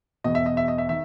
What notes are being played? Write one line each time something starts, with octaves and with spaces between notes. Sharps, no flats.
E1 E2 B2 D#5
E5
D#5
E5
D#5
E5
D#3 E5